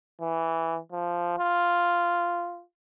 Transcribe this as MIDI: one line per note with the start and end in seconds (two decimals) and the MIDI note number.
0.21 0.78 52
0.92 1.34 53
1.38 2.62 65